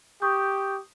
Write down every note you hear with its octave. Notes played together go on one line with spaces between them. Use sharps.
G4 C#6 D#6 G6